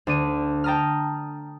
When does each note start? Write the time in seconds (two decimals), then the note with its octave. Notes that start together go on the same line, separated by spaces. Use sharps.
0.07 D2 D4 D#7
0.64 G5 A5 A#5 D#6 F6